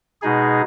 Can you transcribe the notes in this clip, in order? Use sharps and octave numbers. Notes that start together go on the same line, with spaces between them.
B2 G#3 D#4 G#4